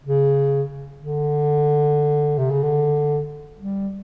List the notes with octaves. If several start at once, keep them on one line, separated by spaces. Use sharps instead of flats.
C#3
D3
C3
C#3
D3
G3